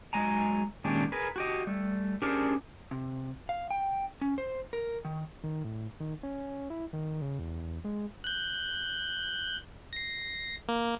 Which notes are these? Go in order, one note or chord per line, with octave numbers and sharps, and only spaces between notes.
F#3 G#3 D#5 G#5 A#5
A#2 D#3 G#3 C#4 D4 G4
G#4 A#4 B4
F#4 G4 D#5
G3 A3
C#4 D4 G4 G#4 A#4 C5
C3
F5
G5
C#4
C5
A#4
D#3
D#3
A2
D#3
C#4
E4
D#3
C#3
E2
G#3
F#6 G6
A#6 C7
A#3